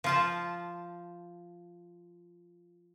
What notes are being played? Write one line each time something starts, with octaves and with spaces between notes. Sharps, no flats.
F3 F4 A5